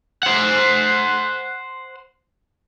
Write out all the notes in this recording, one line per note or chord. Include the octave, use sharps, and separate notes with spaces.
C5 F#5